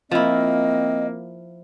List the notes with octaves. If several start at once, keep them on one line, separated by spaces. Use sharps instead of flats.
F3 A#3 C4 E4 D#5